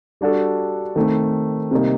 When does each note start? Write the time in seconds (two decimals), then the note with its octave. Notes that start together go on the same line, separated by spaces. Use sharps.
0.21 G3 D4 F#4 A4
0.96 D#3 A3 C4
1.71 C3 G3 A#3 D#4